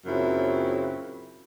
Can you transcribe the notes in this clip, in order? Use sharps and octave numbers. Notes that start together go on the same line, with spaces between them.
F#2 A#2 C#3 C4 E4